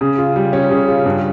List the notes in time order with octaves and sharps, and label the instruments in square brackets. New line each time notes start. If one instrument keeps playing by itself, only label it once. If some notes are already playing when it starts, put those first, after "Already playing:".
[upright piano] C#3
F4
G3
C#4
C#3
F4
G2